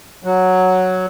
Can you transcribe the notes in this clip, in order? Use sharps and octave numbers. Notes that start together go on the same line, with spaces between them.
F#3